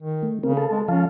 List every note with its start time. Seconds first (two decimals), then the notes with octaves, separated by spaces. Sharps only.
0.03 D#3
0.23 A3
0.43 C#3 C4 A#4
0.57 A4 A5
0.71 G#3
0.88 F3 C#4 F5 A5